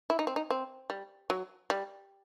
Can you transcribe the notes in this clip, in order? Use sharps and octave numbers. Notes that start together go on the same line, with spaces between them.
E4
D#4
C4
D#4
C4
G3
F#3
G3